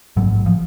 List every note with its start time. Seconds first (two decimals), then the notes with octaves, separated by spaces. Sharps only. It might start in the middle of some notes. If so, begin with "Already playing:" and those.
0.16 A1 G#2 F#3
0.46 F3